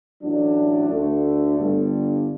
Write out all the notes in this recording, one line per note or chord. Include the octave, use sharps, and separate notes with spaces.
A1 A2 F#3 A3 D4
D2 D3 A3
G1 G2 D3